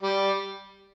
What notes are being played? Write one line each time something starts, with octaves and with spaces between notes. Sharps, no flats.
G3